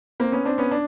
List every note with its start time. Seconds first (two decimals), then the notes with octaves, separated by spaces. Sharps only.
0.20 A#3 C4
0.32 B3 C#4
0.45 C4 D4
0.58 B3 C#4
0.71 D4